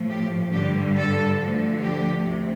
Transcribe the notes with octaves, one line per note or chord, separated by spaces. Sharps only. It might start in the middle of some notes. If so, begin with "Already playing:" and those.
Already playing: A2 F3
G4
G2 D3 G3 G4
A4
D2 D3 F3
G4
D2 C3